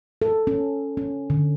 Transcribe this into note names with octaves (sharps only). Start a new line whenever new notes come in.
A4
C#4
C#4
D3